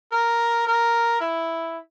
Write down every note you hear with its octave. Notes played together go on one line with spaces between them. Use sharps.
A#4
A#4
E4